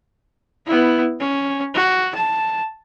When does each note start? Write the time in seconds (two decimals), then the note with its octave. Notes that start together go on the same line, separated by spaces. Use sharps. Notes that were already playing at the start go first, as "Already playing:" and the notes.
0.66 B3 E4
1.20 C#4
1.74 F#4
2.15 A5